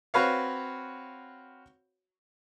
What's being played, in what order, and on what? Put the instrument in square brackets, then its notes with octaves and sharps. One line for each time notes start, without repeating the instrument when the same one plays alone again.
[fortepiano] C4 F#4 B4 C#5 F5